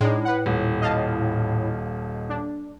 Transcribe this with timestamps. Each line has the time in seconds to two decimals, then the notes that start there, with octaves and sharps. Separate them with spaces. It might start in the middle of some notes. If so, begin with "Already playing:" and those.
0.01 A2 G#3 D4 D#4
0.25 B4 F#5
0.46 D#1
0.82 D#5 F5 A5
2.30 D4